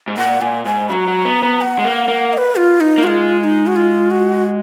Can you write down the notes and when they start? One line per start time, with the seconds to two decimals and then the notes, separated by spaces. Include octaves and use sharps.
0.08 G#2
0.17 A#2 F#5
0.41 A#2 G#5
0.65 G#2 G#5
0.89 F#3 A#5 B5
1.08 F#3
1.25 B3
1.43 B3
1.61 F#5
1.79 G#3
1.84 A#3
2.08 A#3
2.33 D#5
2.38 B4
2.56 F4
2.81 D#4
2.98 A#3
3.03 G#3 F4 F#4
3.40 F4
3.44 D#4
3.67 F#4
3.76 F4
4.11 F#4